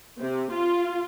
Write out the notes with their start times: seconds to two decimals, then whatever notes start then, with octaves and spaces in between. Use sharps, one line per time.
0.21 C3
0.52 F4